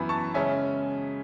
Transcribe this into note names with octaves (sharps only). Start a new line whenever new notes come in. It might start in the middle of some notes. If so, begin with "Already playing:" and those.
Already playing: F#2 E3 B3 E4 G#5 B5
A5 C#6
C#3 G#3 C#4 E5 G#5